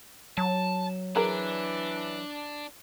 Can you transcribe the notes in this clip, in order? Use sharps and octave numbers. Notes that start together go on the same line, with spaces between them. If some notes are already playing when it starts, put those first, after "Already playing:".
F#3 A5
E3 D4 G#4 A#4